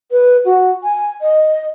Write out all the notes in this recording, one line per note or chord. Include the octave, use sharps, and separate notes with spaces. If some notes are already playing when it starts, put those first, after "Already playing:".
B4
F#4
G#5
D#5